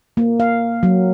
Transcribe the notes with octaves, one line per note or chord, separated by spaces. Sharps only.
A#3
F5
F#3